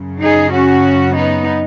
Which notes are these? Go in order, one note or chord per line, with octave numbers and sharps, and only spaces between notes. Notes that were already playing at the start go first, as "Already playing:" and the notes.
Already playing: F#2 C#3
D#4 G#4
C#4 F#4
B3 D#4